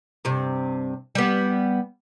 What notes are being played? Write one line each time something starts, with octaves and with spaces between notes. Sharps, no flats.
G2 C3
G3 B3